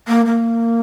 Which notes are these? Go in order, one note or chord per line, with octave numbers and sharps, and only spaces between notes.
A#3
A#3